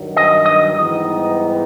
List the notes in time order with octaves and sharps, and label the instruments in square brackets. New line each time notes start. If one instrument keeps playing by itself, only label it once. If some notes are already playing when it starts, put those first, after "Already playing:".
Already playing: [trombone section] G2 D#3 F#3
[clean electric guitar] D#5
D#5
[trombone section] G#2 E3 G3 B3 D#4